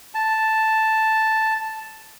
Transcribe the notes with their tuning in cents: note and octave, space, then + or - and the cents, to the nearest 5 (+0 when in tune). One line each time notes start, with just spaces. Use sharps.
A5 +0